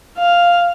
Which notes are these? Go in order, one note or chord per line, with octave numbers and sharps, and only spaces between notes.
F5